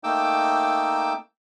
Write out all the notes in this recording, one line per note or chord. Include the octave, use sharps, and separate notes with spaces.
A3 A#3 D#4 G5 D6 E6